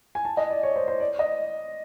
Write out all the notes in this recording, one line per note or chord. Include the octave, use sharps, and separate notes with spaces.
G#5
A5
D#5
D5
C#5
C5
C5
D5
D#5